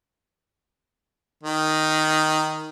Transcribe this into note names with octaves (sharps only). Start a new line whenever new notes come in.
D#3